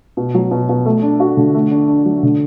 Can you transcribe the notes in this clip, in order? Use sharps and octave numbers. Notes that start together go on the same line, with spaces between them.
B2
F#3
B2
B2
A3
D4
F#4
D3
A3
D4
D4
F#3
D3